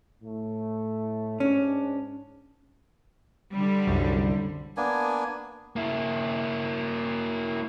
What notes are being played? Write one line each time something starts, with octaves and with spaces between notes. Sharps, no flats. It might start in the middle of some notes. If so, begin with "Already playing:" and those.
A2 A3
G#2 C#4 D4
D3 G3
C2 F#2
A#3 B3 D4 G#5
A#3 E4